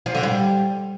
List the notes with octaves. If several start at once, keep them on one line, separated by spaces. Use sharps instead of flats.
F3
D3
G3